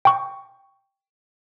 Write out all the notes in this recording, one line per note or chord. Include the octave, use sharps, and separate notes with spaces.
G5 C#6